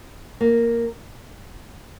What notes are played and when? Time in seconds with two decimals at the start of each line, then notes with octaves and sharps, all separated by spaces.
0.41 A#3